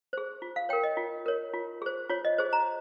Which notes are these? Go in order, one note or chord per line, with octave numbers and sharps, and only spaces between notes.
G#4 C5
F4
F5
A#4 C#5 G5
D#5
F4
A#4 C#5
F4
G#4 C5
F4 C#5
D#5
G#4 C5
A#5